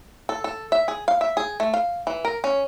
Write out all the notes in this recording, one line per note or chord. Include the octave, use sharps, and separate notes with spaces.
A4
A4
E5
G#4
F5
E5
G#4
A3
F5
E3
A#4
C#4